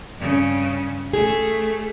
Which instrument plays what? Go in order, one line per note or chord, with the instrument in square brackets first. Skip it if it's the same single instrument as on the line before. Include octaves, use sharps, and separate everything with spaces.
[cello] G2 C#3
[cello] A3 [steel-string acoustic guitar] G#4